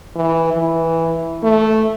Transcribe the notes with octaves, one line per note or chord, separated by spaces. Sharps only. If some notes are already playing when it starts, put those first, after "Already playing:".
E3
E3
A3